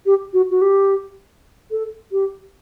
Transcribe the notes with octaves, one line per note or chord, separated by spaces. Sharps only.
G4
F#4
F#4
G4
A4
G4